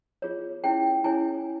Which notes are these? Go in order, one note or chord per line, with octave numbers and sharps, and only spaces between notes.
F4 G#4 C#5
C#4 E4 G#4 C#5 G5
C#4 E4 G#4 C#5 G#5